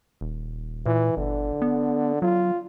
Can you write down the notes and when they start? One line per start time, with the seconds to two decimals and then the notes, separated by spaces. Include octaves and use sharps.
0.21 D#1
0.86 A#2 E3
1.17 G1 D3
1.62 B3
2.22 F#3 F4